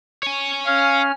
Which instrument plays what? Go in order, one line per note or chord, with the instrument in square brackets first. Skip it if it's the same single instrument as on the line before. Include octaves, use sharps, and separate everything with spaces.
[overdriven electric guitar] C#5 G#5
[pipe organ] C#4 F6 [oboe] F5